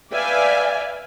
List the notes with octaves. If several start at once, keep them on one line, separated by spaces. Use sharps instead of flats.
B4 D5 E5 F5 G5 G#5